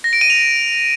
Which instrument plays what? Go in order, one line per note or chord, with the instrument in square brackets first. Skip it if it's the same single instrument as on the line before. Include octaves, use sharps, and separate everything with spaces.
[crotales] A#6
D7
D#7
F7